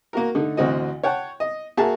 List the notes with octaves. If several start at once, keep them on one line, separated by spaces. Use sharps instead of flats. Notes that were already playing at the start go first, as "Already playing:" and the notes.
A#3 F#4 A#4
D3 A3 D#4
A1 D2 C4 F#4 D#5
C#5 F#5 G5 A5
D#5
A#3 F#4 G#4 A#4 E5 A5